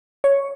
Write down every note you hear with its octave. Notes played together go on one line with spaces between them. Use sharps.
C#5